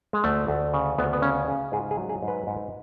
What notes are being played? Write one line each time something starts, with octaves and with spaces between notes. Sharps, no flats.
G#3
D2 A3
D2
C#3
D2 B3
B3
C#3 C#4
C#3
G#2 G#4
G#4
F#3
G#4
G#2
B4
G#2